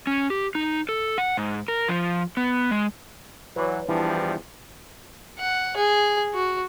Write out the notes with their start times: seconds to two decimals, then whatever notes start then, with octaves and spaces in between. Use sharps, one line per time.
0.07 C#4
0.30 G4
0.55 D#4
0.89 A4
1.18 F#5
1.37 G#2
1.68 A#4
1.88 F3
2.37 B3
2.71 G#3
3.56 E3 F#3 B4 C#5 D5
3.89 E2 E3 F3 G3 D4
5.38 F#5
5.77 G#4
6.34 F#4